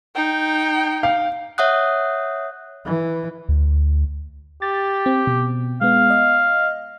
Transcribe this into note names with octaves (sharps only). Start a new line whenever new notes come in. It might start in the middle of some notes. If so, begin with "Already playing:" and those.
D#4 G5
F5
C#5 E5 F#5 D#6 F#6
E3
D2
G4 A6
C4
B2
G#3 B3 F5
D#5